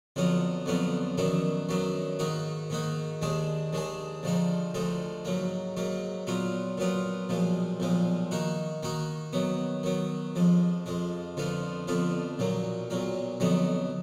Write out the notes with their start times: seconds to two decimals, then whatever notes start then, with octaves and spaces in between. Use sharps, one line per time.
0.16 F2 D3 F#3 B3 F4
0.66 F2 D3 F#3 B3 F4
1.18 F#2 D#3 F#3 B3 D4
1.69 F#2 D#3 F#3 B3 D4
2.19 G#2 D#3 A#3 D#4 F#4
2.70 G#2 D#3 A#3 D#4 F#4
3.22 D#2 D#3 G#3 D4 G#4
3.73 D#2 D#3 G#3 D4 G#4
4.23 D2 D3 F3 G#3 D#4
4.74 D2 D3 F3 G#3 D#4
5.25 G#2 F#3 A#3
5.77 G#2 F#3 A#3
6.27 A#2 F#3 B3 F4
6.78 A#2 F#3 B3 F4
7.29 B1 A#2 F3 G#3
7.80 B1 A#2 F3 G#3
8.31 D#3 A#3 D#4 F#4
8.83 D#3 A#3 D#4 F#4
9.33 D#3 F#3 B3
9.83 D#3 F#3 B3
10.36 F2 F3 G#3
10.86 F2 F3 G#3
11.37 F2 D3 F3 B3 F4
11.88 F2 D3 F3 B3 F4
12.39 B1 A#2 F#3 A#3
12.90 B1 A#2 F#3 A#3
13.40 F2 D3 F#3 B3 D#4